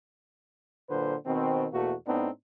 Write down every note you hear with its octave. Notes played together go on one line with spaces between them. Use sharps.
A#2 D3 F#3 B4 C5
B2 D#3 C4
E2 B2 A3 A#3 F#4
A2 B3 C4 D4 D#4